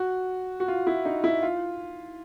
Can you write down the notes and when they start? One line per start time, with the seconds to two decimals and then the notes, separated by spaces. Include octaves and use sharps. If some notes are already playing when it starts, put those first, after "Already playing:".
Already playing: F#4
0.60 F#4
0.68 F4
0.87 E4
1.05 D#4
1.24 E4
1.43 F4